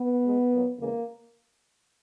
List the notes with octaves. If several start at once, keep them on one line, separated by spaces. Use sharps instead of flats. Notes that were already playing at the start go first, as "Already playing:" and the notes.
Already playing: B3
B2 G#3
A#2 F#3
E2 C#3 E3 G#3 A#3